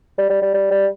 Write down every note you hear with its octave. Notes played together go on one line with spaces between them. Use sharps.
G3
G3
G3
G3
G3